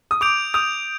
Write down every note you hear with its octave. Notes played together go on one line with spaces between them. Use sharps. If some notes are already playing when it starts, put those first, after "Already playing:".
D#6
D6 G6 D7 F7
D#6 G6 D7 F7